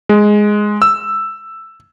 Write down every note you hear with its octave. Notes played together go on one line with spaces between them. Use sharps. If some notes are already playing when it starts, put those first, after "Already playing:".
G#3
E6